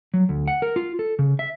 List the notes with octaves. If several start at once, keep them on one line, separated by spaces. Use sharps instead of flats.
F#3
D2
F#5
A#4
F4
A4
C#3
E5